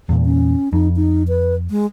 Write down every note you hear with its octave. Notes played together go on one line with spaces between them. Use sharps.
E2 A#2
C#4
F2 D#4
D#4
B4
G#3